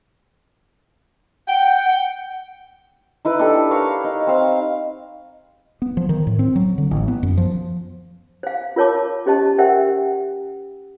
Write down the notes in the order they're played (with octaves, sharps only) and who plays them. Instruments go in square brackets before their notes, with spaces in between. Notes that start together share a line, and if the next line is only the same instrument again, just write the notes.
[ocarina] F#5 [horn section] G5
[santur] D#4 E4 B4
D4 E4 G4 A4
A#4 B4 C#5 F5
D#4
C4 F5
[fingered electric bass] B3
F3
D#3
A2
C4
F#3
D3
A1
B3
F#2
F3
[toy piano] C5 F5
F4 A#4 C#5 A5 D6
C#4 G4 C5 D#5 A5
G4 A#4 C5 E5 F#5 G5